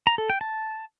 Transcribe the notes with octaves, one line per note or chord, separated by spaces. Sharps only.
A#5
A4
G5
A5